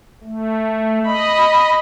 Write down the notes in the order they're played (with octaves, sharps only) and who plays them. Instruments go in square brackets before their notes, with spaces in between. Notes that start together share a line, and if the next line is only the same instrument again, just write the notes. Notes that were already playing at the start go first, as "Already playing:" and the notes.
[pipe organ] A3
[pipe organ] D#5 [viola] B5